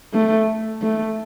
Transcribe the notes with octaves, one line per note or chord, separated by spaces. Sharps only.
A3
A3